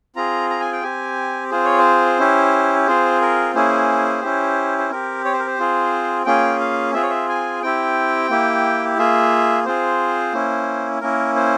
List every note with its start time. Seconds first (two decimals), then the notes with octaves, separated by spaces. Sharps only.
0.16 C4 F4 G#4 A#5
0.50 A#5
0.60 G#5
0.73 G5
0.83 C4 G4 G#5
1.51 C4 F4 G#4 C5
1.65 C#5
1.78 C5
2.19 C#4 E4 G4
2.87 C4 F4 G#4 C5
3.21 A#4
3.55 A#3 C#4 E4 G#4 C5
4.22 C#4 E4 G4
4.78 C5
4.90 C4 G4 A#4
5.25 C#5
5.33 C5
5.39 A#4
5.47 C5
5.59 C4 F4 G#4
6.26 A#3 C#4 F4 G#4 G5
6.60 F5
6.94 C4 F4 G#4 E5
7.03 C#5
7.10 E5
7.29 G#5
7.63 C4 E4 G4 G5
8.30 A#3 E4 G4
8.98 A#3 F4 G#4 E5
9.65 C4 F4 G#4 C5
10.33 A#3 C#4 E4
11.01 A#3 C#4 E4 A#4
11.36 C5